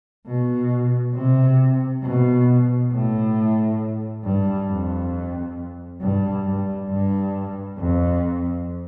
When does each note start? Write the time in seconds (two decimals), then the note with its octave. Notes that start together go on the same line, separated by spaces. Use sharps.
0.26 B2
1.14 C3
2.03 B2
2.92 A2
4.24 G2
4.69 F2
6.01 G2
6.45 G2
6.89 G2
7.78 F2